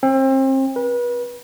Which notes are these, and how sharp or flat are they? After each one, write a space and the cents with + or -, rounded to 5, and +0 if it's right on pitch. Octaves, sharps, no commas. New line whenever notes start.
C4 +35
B4 -35